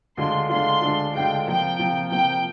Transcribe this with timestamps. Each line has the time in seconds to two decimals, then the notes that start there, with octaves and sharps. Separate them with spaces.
0.17 D2 D3 G#3 D4 F4 C6
0.49 D2 D3 G#3 D4 F4 C6
0.82 D2 D3 G#3 D4 F4
1.15 D2 D3 G#3 D4 F4 G5
1.47 C3 F3 A#3 G5
1.79 C3 F3 A#3
2.11 C3 F3 A#3 G5